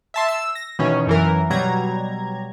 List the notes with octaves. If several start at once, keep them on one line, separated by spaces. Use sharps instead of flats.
E5 A5 C6
E6
A#6
B2 D#3 E3 C#4
F#2 E3 A#4
B2 F#3 G3 A#5 G#6